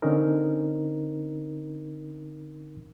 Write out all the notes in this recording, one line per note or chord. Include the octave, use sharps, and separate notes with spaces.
D3 C4 C#4 D#4 A#4